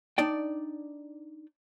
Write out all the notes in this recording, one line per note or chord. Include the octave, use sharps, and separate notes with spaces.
D4 D#4 D5 G5